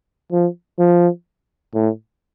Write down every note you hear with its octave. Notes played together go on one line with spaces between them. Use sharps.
F3
F3
A2